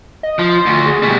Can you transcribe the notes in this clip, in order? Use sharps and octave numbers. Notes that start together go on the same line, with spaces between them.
D#5
F3 C6
D2
G#4
B2 G3 G#4